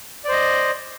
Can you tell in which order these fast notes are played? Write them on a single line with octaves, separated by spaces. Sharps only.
D5 C5 D#5